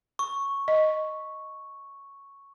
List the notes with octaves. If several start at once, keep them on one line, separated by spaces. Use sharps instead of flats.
C#6
D#5